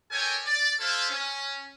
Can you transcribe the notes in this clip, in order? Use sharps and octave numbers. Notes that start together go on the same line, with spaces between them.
G4 A4 A#4 C#5 G5 G#5
D5
E4 F4 A4 C5 E5 F5
C#4